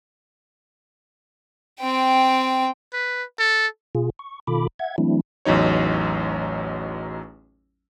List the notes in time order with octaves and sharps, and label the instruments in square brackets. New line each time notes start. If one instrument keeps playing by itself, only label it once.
[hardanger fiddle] C4 G5
[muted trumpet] B4
A4
[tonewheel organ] B2 F4 G#4
C#6
B2 D#3 F4 A4 B5 D6
E5 F#5 G#6
E3 F#3 A3 C4 D4 E4
[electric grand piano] A1 E2 F#3 D#4 C#5